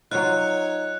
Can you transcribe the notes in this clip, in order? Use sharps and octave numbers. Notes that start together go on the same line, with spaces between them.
F#3 D#4 F4 C#5 F#6